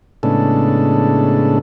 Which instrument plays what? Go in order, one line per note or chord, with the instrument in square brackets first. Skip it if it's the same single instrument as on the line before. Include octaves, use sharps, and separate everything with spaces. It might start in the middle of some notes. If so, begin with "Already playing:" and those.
[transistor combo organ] A2 C#3 G#3 B3 D4 A4